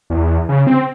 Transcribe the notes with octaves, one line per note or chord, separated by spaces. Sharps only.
E2
C#3
C4